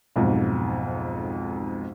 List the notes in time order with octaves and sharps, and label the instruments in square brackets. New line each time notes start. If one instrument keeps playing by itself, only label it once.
[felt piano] B1 F2 G#2